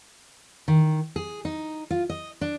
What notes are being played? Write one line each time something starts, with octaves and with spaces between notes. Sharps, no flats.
D#3
G#4
D#4
F4
D#5
D4